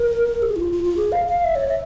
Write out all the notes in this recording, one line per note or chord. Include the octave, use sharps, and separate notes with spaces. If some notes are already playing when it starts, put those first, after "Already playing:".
Already playing: A#4
G4
G#4
E4
F4
F4
F4
G#4
F5
F5
E5
C#5
E5